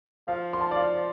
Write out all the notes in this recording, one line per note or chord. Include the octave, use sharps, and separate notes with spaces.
F3 F5
C6
A5
D5
F5